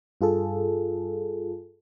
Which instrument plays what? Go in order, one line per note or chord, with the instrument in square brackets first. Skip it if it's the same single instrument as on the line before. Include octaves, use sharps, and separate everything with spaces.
[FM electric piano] G2 F4 G#4 A4